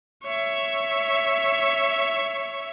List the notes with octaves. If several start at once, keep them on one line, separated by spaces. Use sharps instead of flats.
C#5 E5